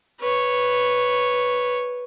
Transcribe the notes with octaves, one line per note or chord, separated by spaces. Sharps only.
B4 C#5